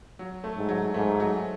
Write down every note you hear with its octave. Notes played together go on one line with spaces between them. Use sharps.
F#3
A3
G#2
F#3
G#2 A3
F#3